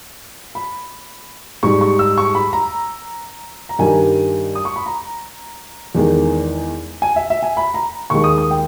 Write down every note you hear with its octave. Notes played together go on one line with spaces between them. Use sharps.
B5
G#2 G3 C#6
C#6
E6
C#6
B5
A#5
A#5
G2 D#3 G3 G#5
D#6
C#6
B5
A#5
E2 D#3 G#3
G#5
E5
E5
G#5
B5
A#5
D#2 D#3 G#3 C#6
D#6
D#6
G5